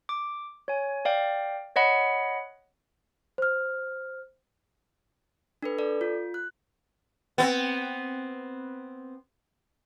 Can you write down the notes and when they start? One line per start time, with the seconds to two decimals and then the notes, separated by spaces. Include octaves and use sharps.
0.09 D6
0.68 C#5 G#5
1.05 D5 F5 G5
1.76 C#5 D#5 F#5 B5
3.38 C5 F6
5.62 D4 A4 B4
5.78 A4 D5
6.01 F4
6.34 F#6
7.38 B3 C4